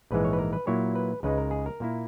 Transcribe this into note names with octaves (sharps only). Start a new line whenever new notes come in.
A#1 G#2 E3 G#3 B4
C#5
B4
A#4
B4
A#2 F#3 A#3 E4 C#5
B4
C#2 C#3 G#3 D#4 B4
A#4
G#4
A#4
A#2 A#3 E4